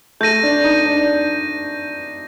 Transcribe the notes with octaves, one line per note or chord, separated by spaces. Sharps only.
A3 G6 A#6 D#7
D4
D#4
D4